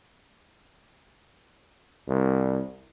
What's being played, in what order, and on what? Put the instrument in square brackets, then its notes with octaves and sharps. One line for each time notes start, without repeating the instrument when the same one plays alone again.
[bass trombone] C2